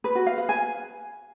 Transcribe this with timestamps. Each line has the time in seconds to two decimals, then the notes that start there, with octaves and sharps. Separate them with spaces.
0.04 B4
0.15 F#4
0.27 F5
0.38 B4
0.49 G#5